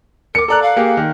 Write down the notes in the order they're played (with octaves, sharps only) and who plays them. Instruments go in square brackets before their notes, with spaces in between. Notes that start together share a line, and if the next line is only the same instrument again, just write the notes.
[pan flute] A#4 [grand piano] D6 C#7
[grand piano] A4 D5 F#6 [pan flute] A#5
[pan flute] F5
[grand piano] A#3 G4 G#4
D#3